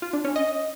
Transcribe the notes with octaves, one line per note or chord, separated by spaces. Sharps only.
F4
D4
C#4
D#5